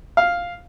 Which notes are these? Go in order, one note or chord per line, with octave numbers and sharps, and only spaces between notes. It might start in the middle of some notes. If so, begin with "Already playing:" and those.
F5